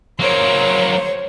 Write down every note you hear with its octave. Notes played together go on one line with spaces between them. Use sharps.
F#3 A#3 C5 C#5